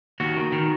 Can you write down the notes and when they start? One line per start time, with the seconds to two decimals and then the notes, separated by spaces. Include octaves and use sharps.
0.20 D#2 F#4
0.36 D#3
0.52 D#3